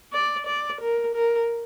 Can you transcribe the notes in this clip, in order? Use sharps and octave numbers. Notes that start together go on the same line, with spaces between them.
D5
D5
A#4
A#4